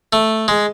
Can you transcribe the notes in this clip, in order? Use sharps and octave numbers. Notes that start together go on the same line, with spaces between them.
A3
G#3